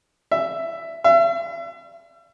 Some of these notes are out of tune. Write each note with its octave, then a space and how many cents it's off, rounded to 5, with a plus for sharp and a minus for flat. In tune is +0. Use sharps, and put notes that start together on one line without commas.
E5 +10
E5 +40